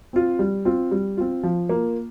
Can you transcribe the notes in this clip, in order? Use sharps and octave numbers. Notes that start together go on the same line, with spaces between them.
C4 F4
G3
C4 F4
G3
C4 F4
F3
A#3 F4